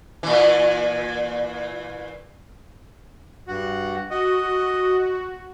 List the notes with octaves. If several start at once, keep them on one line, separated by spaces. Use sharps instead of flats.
A#2 E3
G2 F#4
F#4 D#5